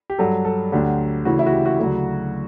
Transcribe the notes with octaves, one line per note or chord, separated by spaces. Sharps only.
G4
G2 F#3 A4
A4
D2 D3 F#3 G4
D2 C#3 E3 F#4
E4
F#4
G4
F#4
D2 C#3 F#3